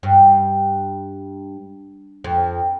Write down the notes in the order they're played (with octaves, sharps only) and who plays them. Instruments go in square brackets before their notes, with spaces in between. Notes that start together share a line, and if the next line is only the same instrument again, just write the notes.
[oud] G2
F2